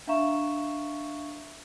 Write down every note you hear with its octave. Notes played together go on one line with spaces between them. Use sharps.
D4 E5 F5 A#5 C#6 E7